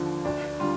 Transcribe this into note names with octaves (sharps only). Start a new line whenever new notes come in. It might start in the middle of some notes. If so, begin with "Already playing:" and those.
Already playing: D#2 D3 F3
D2 D4
D3 G3 F4